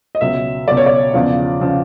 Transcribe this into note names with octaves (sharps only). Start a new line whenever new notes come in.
D#5
C#2 B2 F#3 E5
C#2 B2 F#3 D5
C#5
D5
E2 C#3 F3
C#3 F3